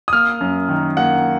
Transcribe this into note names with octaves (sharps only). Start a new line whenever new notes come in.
D#6
A#3 F6
F#2
D#3
A#3 F#5